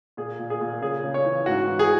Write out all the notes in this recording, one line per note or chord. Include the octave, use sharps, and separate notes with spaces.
A#2 G#4
A#2
G#4
A#2
C#3 G#4
C#3
C#5
E3
G#2 F#4
E3
G#4